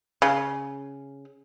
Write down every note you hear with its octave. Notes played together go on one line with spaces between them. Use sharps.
C#3